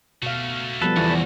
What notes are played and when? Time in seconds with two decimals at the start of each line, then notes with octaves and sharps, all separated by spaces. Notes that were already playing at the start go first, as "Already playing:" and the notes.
0.22 B2 A3 F#4 F5
0.82 F3 G3 B3 A4 B4
0.97 E2 C#3 F#4